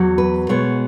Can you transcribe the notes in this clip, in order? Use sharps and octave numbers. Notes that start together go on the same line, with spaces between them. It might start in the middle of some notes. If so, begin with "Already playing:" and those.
Already playing: E2 F#3
B4
B2 G#3 B3 C#5